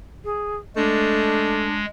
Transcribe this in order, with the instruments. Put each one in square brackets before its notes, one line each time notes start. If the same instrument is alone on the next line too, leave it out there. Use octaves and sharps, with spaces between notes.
[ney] G#4
[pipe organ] G#3 [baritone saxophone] A3 [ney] D4